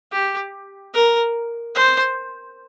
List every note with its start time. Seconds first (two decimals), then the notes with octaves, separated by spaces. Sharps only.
0.12 G4
0.94 A#4
1.75 C5